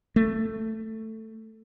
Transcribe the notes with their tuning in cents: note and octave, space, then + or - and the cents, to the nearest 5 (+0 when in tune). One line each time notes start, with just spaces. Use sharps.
A3 +10